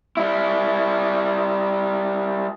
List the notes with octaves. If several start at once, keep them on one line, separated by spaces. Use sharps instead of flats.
G3 E4